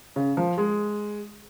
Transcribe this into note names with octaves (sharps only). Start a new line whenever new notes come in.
C#3
F3
G#3